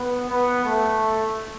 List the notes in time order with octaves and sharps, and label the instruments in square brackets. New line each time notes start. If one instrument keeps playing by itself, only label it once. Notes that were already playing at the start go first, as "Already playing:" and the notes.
Already playing: [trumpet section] B3
B3
A3